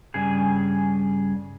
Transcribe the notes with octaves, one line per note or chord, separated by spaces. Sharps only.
G2 C#3 G#4